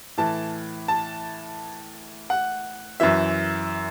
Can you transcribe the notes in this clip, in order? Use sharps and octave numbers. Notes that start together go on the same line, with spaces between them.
A2 E3 A5
A5
F#5
F#2 E3 E5